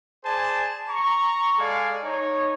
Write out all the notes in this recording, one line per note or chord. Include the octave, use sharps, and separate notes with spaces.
G#4 C5 D5 G#5 A5
A#5 C#6
G#3 A4 D5 F5 G#5
D#4 C#5